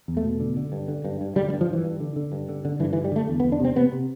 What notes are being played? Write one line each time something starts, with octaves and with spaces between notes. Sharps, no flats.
E2
A3
B2
D3
D3
G2
D3
G2
G2
D3 G3
G3
G2
F3
G2 E3
G2
D3
D3
G2
D3
D3
G2 E3
E3
D3
G3
D3 A3
E2
B3
E2
D4
C3 C4
C3 B3
C3